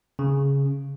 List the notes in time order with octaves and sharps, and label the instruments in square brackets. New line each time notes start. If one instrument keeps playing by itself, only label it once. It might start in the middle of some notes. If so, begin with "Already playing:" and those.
[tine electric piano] C#3